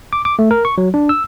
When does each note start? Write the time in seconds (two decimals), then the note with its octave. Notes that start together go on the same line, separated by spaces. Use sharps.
0.13 D6
0.25 D6
0.39 A3
0.51 A#4
0.65 C#6
0.78 F#3
0.94 D4
1.09 E6